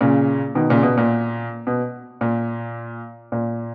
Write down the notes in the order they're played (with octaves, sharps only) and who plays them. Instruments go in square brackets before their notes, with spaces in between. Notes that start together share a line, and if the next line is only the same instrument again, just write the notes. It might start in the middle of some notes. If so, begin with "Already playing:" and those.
[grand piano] A#2 C#3
B2 D#3
A#2 C#3
B2
A#2
B2
A#2
A#2